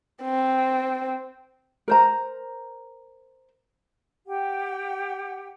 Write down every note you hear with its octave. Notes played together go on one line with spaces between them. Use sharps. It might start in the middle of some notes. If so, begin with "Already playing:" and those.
C4
A#4 C5 A#5
G4 F#5 G5